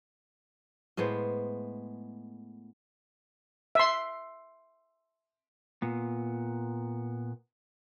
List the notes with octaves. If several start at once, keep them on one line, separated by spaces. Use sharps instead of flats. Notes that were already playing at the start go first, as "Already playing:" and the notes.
A2 G#3 B3 C5
E5 C6
A#2 B3